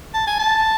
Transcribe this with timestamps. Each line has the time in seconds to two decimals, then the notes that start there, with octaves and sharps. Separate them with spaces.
0.14 A5
0.27 G#5
0.40 A5